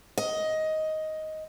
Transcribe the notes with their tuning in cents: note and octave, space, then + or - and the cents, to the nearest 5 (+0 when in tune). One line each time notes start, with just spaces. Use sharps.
D#5 +10